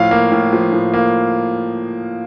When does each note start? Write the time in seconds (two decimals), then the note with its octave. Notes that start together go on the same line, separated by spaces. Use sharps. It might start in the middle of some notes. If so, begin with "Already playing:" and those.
Already playing: A2 F3 F5
0.11 A#3
0.32 A2
0.53 F3
0.72 A2
0.94 A#3